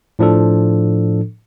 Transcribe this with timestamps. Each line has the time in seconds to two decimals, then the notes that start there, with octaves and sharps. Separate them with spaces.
0.19 A2 F3 D4 A4